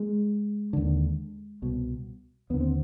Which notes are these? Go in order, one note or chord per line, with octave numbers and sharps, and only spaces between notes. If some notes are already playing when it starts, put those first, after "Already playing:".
Already playing: G#3
D#2 D3
C2 B2
D#2 D3 B3
C4